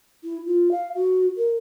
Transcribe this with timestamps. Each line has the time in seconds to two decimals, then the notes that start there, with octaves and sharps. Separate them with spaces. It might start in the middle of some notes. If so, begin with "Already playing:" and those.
0.24 E4
0.46 F4
0.71 F5
0.95 F#4
1.37 A#4